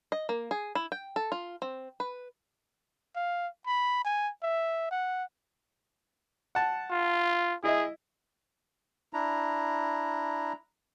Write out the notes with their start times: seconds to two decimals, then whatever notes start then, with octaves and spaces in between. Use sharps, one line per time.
0.12 D#5
0.29 A#3
0.51 G#4
0.75 E4
0.92 G5
1.16 A4
1.32 F4
1.62 C4
2.00 B4
3.16 F5
3.67 B5
4.04 G#5
4.43 E5
4.91 F#5
6.55 F#5 A5
6.91 F4
7.64 E4 G#4 D#5 E5
9.13 D4 E4 A#5